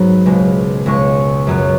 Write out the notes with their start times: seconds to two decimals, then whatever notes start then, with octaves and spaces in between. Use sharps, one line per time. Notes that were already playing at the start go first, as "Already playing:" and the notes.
Already playing: G#2 F#3 B3 B5
0.26 C#2 B2 G#3
0.86 C#2 B2 G#3 C#6
1.47 F#2 F#3 B3